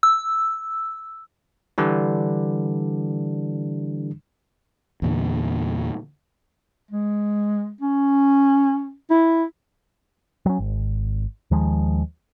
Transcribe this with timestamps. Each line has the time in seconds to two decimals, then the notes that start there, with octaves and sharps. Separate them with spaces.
0.03 E6
1.78 D3 E3 G3 D4
5.02 E2 A#2 D3
6.91 G#3
7.81 C#4
9.10 E4
10.46 F#3 C#4
10.59 G#1
11.51 D#2 D#3 F3 G#3